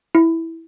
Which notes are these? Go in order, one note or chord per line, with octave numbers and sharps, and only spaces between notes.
E4